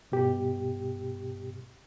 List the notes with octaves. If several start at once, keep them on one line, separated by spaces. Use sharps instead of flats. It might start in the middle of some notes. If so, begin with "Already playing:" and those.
G2 B2 G4